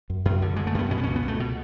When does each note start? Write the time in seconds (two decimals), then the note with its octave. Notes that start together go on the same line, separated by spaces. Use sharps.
0.10 F#2
0.25 F#2
0.42 D3
0.56 D3 G#3
0.67 A3
0.74 F#2 B3
0.91 B2 C#4
0.98 B3
1.03 C#4
1.07 C#2
1.16 B3
1.23 C#2
1.28 A3
1.40 B2